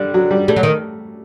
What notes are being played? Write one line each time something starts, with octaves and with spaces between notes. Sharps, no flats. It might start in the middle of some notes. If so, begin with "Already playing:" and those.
Already playing: D3 G3
F#3
G3
G3 A3
F#3
D#3